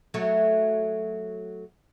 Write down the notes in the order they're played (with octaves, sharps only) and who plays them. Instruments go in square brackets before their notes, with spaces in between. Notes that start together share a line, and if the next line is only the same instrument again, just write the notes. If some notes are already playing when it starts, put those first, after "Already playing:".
[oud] F#3 A3